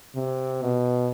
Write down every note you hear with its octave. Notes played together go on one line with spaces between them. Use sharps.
C3
B2